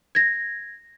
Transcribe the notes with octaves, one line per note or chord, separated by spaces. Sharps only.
G#6 A#6